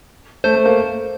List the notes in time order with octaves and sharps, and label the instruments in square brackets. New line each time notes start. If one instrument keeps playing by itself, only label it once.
[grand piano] A3 [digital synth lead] C5
[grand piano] A3
A#3